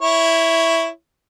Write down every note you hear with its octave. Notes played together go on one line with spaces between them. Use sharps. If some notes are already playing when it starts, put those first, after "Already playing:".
E4 C#5